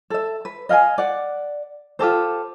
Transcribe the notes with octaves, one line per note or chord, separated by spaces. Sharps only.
A4 E5
B4
D#5 F5 G5 G#5
D5 F#5
F4 G4 A4 C5